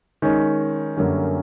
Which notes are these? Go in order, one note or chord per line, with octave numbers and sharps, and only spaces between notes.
D#3 G#3 C#4
F#2 D3 G3 A#3 C#4